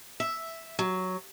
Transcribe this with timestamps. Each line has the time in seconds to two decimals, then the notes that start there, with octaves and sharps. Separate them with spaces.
0.20 E5
0.79 F#3